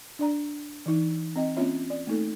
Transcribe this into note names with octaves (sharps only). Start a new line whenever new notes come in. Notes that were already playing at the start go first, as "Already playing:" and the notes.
D4 D5 A#5
E3 D#4
C4 D#5 G5
A#3 C4 C#4 F4 C#5 E5
D5
A3 A#3 D#4 A4